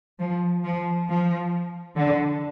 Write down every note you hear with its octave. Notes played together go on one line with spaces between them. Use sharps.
F3
F3
F3
D3